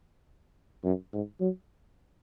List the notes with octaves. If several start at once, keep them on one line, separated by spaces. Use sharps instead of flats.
F#2
G#2
F#3